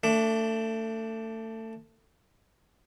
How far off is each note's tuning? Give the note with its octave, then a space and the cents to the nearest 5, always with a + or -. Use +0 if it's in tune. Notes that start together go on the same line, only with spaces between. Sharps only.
A3 +25 D4 -5